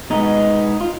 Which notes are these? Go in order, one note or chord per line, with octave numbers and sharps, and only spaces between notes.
B2 G#3 B3 D#4
F4